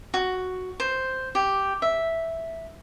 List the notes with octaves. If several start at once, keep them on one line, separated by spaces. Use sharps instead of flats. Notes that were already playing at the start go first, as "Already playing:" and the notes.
F#4
C5
G4
E5